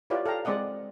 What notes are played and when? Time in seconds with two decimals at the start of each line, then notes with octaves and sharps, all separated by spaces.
0.10 E4 F4 G4 B4 C#5 D5
0.26 A4 F5 G5 A#5
0.45 G#3 C4 D5 D#5 F#5